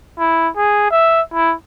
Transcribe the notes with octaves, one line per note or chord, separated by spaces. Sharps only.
E4
G#4
E5
E4